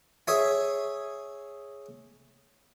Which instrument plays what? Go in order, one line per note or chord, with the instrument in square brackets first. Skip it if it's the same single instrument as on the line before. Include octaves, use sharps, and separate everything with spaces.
[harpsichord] G#4 C#5 E5 G#5